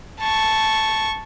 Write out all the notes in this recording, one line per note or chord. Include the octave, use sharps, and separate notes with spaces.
A5 C#6